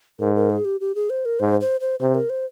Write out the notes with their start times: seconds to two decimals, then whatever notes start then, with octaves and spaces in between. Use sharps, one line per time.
0.20 G#2 A#4
0.35 A#4
0.50 G#4
0.65 G4
0.81 G4
0.95 G#4
1.10 C5
1.25 A#4
1.39 G#2 C5
1.61 C5
1.81 C5
2.00 C3 C5
2.15 A#4
2.30 C5